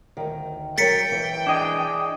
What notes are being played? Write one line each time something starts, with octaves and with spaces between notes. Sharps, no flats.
D2 D#3
F#3 A#4 G5 A6 B6 C#7
E3
D4 G#4 D#5